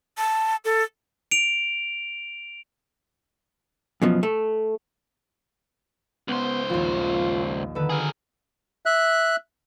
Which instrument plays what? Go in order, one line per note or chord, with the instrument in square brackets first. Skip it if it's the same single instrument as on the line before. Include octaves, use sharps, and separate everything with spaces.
[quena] A5
A4
[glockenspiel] D7 F7
[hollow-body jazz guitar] F#2 B2 F3
A3
[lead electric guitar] C#2 C5 [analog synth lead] B3
[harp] A#1 D#2 [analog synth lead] F4
[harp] D3 D#3 A4 [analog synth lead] B4
[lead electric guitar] G#4 A#4
[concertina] E5 F#6